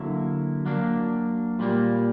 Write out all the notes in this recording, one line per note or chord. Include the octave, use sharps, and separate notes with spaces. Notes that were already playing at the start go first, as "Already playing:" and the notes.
Already playing: D3 F#3 A#3 E4
F#3 A#3 D4
A#2 G3 A#3